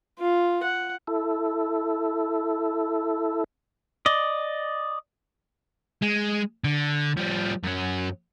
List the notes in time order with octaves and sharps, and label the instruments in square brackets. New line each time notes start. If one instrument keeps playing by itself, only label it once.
[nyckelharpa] F4
F#5
[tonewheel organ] E4 A4
[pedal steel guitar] D5 D#5
[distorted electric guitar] G#3
D3
F3 G3
F#2 F#3